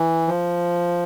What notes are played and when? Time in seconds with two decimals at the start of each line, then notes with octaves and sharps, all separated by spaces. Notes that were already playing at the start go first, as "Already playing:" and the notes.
Already playing: E3
0.28 F3